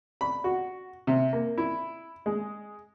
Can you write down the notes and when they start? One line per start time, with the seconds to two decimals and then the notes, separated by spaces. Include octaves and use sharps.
0.21 B5
0.44 F#4
1.07 C3
1.33 A#3
1.58 E4
2.26 G#3